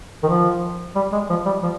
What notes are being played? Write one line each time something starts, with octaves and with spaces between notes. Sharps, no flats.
D#3
F3
G3
G#3
F3
G3
F3